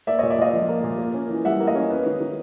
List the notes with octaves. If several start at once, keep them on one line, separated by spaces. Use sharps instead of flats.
A#3 D5 E5
A#2 C#5 D#5
D5 E5
A#2 D#5 F5
F3
A#3
A#2
A#3
C#4
E3
G3 E5 F#5
A#3
D#5 F5
C#4
B3
D#3
D#3